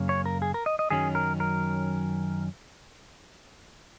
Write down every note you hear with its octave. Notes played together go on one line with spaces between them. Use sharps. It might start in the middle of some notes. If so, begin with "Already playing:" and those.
Already playing: F#2 C#3 A#3 C#4
C#5
A#4
G#4
A#4
D#5
D#5
F#2 D#3 F#3 C#4 G#4
A#4
A#4